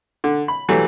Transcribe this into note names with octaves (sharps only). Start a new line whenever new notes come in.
D3
B5
E3 F#3 G3 A3